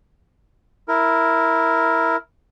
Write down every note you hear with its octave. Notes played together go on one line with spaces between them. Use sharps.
E4 A#4